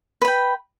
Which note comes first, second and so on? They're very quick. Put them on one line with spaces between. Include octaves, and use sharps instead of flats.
B4 B5 G5